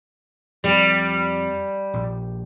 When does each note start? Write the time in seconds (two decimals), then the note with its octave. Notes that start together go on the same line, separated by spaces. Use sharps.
0.64 F2 F3 G3 C4
1.93 A#1